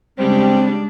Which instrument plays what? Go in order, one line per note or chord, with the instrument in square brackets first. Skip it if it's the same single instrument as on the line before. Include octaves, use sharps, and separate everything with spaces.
[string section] C#3 G3 [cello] G#3 D4 [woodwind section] C4